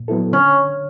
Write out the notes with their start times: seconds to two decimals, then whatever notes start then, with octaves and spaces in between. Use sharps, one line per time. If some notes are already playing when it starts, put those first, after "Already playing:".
Already playing: A#2
0.08 F#3 B3 E4 A4
0.32 D3 C#4